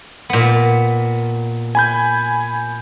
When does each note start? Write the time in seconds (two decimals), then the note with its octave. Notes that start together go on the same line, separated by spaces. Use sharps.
0.29 A#2 B3
1.75 G#5 B5 G6